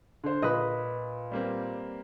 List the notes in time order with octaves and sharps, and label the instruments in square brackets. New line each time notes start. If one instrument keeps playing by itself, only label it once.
[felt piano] D3 C5
[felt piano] A#2 [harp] B4 D#5
[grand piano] G3 A#3 C4